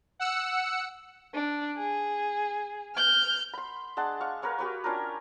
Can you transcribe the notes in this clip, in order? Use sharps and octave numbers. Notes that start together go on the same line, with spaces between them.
F#5 E6 C#7
D4
G#4
F6 G6
B5 C6
G#3 D4 F#5 A5
F5 C#6
A#4 B4 C#5 F5
F#4 G4 B4 C#5
C#4 D4 F4 A#4